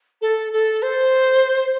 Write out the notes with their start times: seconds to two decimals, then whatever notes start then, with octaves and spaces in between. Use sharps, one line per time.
0.21 A4
0.52 A4
0.82 C5